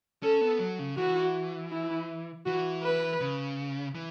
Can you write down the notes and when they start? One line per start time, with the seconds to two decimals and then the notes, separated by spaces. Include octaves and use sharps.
0.23 C#4 A4
0.41 B3
0.59 F#3
0.79 C#3
0.97 E3 F#4
1.71 E4
2.46 E3 F#4
2.83 B4
3.21 C#3
3.95 E3